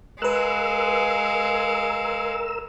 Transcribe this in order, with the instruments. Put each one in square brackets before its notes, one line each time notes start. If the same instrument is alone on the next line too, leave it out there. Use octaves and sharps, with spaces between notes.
[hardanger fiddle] G#3 F5 [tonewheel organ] A#4 E6 [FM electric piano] B4 F#6